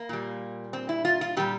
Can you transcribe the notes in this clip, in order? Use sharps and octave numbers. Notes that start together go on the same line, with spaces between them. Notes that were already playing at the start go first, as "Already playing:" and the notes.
Already playing: A#3
A#2 G3
C4
E4
F4
F4
A#2 G3 G4